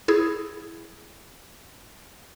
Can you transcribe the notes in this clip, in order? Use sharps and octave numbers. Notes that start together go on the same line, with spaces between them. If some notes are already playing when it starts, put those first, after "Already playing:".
E4 G#4